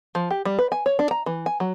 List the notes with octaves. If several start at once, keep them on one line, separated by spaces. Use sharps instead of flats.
F3
G4
G3
B4
G#5
C#5
D4
A#5
E3
G#5
F#3